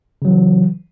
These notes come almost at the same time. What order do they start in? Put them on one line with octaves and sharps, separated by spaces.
C#3 F#3 E3